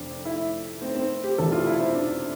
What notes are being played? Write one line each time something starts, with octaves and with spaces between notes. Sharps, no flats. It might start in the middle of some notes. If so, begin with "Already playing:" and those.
Already playing: F1 F2 C4 D4
E4
C4
C4
G4
E1 E2 C3 E3 A4
F4
E4
C4
D4